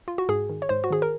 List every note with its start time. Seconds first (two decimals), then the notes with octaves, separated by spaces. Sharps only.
0.08 F4
0.18 F#4
0.29 G#2 G#4
0.50 D#3
0.62 C#5
0.69 G#2 C5
0.84 F#4
0.90 D#3 G#4
1.02 A#4